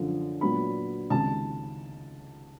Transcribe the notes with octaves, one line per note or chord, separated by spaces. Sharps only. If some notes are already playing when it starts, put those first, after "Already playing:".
Already playing: F#2 D3 F3
A#2 F#3 B3 D4 B5
C#2 C3 D#3 A5